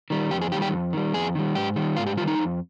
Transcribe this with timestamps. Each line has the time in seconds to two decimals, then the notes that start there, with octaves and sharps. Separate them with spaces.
0.10 D#3 G3
0.31 F2 G4
0.41 G#4
0.52 D#3 G4
0.56 G3
0.62 G4
0.72 F2
0.93 D#3 G3
1.14 F2 G#4
1.35 D#3 G3
1.55 G#2 G4
1.76 D#3 G3
1.97 G#2 F4
2.07 G4
2.17 G3 F4
2.21 D#3
2.27 D#4
2.38 F2